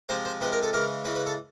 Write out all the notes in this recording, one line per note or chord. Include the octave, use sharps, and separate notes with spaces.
C3 F3 G#3 C5
C5
C3 F3 G#3 B4
A#4
A4
C#3 E3 G#3 A#4
C#3 E3 G#3 B4
B4
A4